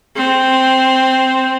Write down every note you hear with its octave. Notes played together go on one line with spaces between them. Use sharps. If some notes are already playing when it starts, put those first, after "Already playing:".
C4